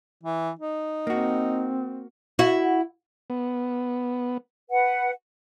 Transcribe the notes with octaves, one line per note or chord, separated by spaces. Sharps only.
E3
D#4
A#3 C4 F#4
E4 F#4
B3
B4 F#5